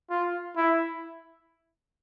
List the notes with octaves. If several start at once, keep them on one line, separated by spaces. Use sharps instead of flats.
F4
E4